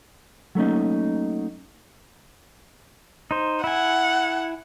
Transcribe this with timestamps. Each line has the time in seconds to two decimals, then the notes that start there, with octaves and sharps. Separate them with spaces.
0.55 F#3 A3 A#3 C#4 D#4
3.31 D#4 C5
3.64 E4 F#5 G#5